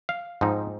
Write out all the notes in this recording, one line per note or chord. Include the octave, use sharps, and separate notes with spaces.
F5
G#2 F3 C4 D#4